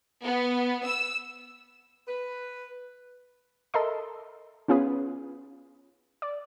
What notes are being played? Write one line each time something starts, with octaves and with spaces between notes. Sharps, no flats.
B3
E6
B4
A4 A#4 D#5 E5 C6
B3 C#4 F4 G#4 B4
D5